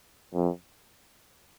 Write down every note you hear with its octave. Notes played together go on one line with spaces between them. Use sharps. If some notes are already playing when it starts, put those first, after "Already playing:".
F2